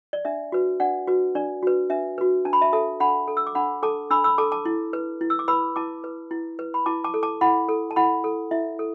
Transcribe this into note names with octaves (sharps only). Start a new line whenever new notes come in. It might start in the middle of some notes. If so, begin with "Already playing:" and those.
D5
D4 E5
F#4 B4
D4 D5 F#5
F#4 B4
D4 D5
F#4 B4
D4 E5
F#4 B4
D4 A5
B5
E5 A5
A4 E5 A5
D4 F#5 B5
A4
E6
D6
D4 F#5 B5
A4 A5 D6
D4 B5 E6
B5 E6
A4 A5 D6
A5 D6
E4
B4
E4
E6
D6
B4 B5 E6
E4 A5 D6
B4
E4
B4
B5
E4 A5 D6
A5 D6
A4
A5 D6
E4 F#5 B5
A4
A5
E4 F#5 B5
A4
E4 E5
A4